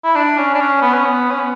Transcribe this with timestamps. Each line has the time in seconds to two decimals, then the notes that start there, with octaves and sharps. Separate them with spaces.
0.04 E4
0.16 D4
0.38 C#4
0.54 D4
0.60 C#4
0.82 B3
0.93 C#4
1.05 B3
1.30 C#4
1.39 B3